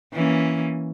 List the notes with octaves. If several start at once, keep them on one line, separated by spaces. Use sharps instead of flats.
E3 A#3 C#4